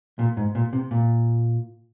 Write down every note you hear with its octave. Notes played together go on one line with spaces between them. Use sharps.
A#2
G#2
A#2
C3
A#2